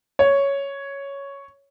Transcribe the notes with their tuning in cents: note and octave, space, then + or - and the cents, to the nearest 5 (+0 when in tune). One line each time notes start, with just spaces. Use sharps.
C#5 +5